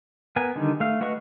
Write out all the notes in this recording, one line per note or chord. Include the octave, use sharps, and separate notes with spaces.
B3 A#4 G#5
D3 D#3 G3 D#4
A3 F5
A3 F#4 B4 D#5 C#6